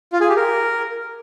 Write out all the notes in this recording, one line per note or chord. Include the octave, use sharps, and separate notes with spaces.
F4
G#4
G4
A#4